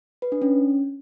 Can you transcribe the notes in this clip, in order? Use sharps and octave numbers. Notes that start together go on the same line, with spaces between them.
B4
D4
C#4